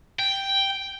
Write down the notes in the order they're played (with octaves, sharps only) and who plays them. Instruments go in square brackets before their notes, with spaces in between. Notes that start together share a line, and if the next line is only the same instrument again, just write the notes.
[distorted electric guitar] G5